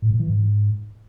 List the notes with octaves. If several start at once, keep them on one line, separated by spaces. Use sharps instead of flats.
A2
A#2
E3
G#2